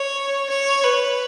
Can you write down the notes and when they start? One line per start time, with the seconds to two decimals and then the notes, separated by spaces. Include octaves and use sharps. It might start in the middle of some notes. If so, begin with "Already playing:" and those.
Already playing: C#5
0.49 C#5
0.83 B4